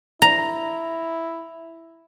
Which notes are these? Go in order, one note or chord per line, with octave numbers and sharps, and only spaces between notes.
E4 A#5